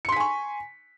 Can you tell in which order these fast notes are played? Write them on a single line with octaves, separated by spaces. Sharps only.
C#7 C6 B6 G#5 C#6